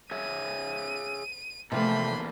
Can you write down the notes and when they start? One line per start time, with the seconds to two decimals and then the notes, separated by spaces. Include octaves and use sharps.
0.11 G#4 C#5 E5 D#7
1.72 E2 C3 F3 A3 A#3 A4 B5 C6